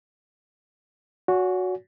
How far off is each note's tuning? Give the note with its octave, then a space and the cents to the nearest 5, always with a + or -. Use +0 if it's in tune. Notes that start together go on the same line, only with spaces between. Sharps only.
F#4 -10 C#5 +40 G#5 +0